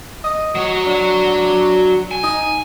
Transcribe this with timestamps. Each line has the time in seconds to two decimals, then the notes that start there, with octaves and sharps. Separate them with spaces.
0.24 D#5
0.55 F#3 C#5
0.86 D4
2.11 G#5
2.23 D#4